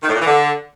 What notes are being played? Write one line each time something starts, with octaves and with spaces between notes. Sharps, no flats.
D#3
A2
A#2
E3
D3